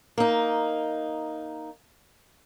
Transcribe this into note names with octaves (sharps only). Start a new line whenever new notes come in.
A#3 D#4